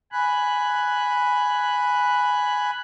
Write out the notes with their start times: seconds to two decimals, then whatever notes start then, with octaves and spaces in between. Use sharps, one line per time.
0.12 G#5 B5 F#6